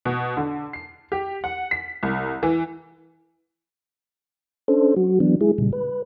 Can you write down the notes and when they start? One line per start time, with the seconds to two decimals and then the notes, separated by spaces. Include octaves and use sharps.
0.05 B2
0.37 D3
0.73 C7
1.12 G4
1.44 F#5
1.71 B6
2.03 C2
2.43 E3
4.68 C#4 D4 A4 C5
4.96 F#3 F#4
5.20 E3 F#3 B3 D4
5.41 G#3 E4 G#4
5.58 A#2 C#3 G3
5.73 B4